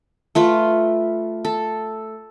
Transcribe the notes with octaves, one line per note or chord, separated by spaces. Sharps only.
A3 F4 B4
A4